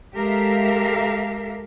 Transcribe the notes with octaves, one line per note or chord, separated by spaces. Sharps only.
G#3 G4 A4 A#4 E5 F5